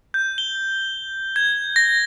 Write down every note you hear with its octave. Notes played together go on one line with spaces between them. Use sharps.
G6
G7
G#6
A#6